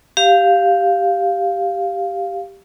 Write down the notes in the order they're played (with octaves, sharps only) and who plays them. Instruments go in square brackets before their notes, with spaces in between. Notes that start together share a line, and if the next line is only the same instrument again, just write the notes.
[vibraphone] G4 F5